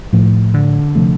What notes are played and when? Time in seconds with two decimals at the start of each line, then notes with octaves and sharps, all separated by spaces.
0.13 A2 F3 A3
0.54 D3
0.95 C3 F3 A3